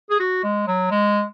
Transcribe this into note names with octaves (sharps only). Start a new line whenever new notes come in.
G#4
F#4
G#3
F#3
G#3